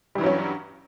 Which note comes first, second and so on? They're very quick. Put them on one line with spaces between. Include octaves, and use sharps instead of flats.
G3 E3 G2 F#3 C#4